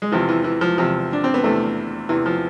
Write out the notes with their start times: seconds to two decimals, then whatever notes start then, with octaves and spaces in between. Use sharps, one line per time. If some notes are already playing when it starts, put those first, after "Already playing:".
0.02 G#3
0.12 E2 C3 E3 F3
0.29 E3
0.44 E3
0.61 F3
0.77 E2 C3 E3 F3
1.13 D4
1.24 C4
1.34 B3
1.44 E2 C3 E3 A3
2.09 E2 C3 E3
2.26 F3